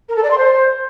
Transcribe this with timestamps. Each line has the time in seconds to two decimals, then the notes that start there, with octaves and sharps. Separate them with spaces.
0.09 A#4
0.16 A4
0.23 D5
0.31 C6
0.38 C5